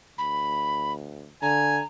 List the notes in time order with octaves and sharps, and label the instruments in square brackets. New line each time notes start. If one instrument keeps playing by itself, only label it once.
[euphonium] D2 [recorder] B5
[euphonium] D3 [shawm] G#5 [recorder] A#5